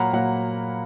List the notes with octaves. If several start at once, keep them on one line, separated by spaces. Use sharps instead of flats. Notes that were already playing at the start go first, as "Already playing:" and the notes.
Already playing: A#2 F#3 A#3 F#5 A#5 B5
A#2 F#3 A#3 F#5 A#5